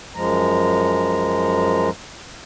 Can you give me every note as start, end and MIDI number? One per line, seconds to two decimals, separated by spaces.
0.15 1.90 42
0.15 1.90 53
0.15 1.90 56
0.15 1.90 82